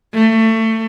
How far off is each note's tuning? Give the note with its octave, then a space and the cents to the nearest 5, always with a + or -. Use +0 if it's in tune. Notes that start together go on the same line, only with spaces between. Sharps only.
A3 +25